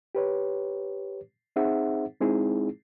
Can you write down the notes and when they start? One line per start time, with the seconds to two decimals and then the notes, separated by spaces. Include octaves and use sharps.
0.15 G4 B4 C#5
1.56 C4 D#4 G#4 C5 E5 F#5
2.21 G#3 C4 D#4 E4 G#4